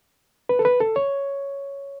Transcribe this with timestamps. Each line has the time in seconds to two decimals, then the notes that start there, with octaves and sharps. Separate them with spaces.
0.49 B4
0.59 A4
0.65 B4
0.80 A4
0.96 C#5